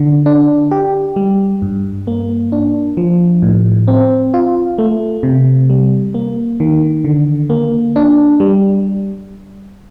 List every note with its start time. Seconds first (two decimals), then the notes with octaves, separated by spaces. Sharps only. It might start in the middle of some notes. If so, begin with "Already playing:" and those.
Already playing: D3
0.26 D4
0.71 G4
1.16 G3
1.62 G2
2.07 A#3
2.52 D4
2.97 F3
3.42 A2
3.88 C4
4.34 F4
4.78 A3
5.23 C3
5.70 G3
6.14 A#3
6.60 D#3
7.05 D3
7.50 A#3
7.96 D4
8.40 G3